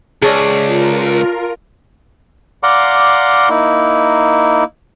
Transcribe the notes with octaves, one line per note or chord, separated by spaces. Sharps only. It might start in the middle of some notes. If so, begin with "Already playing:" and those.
C#2 G#4 A4 C#5 D5
F4 A#4
D5 F5 F#5 A#5 C6 D6
A#3 D#4 E4